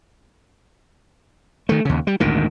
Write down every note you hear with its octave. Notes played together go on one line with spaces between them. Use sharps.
D#3 A3
D#2 C#3
G3
G#1 D2 A#2 D#3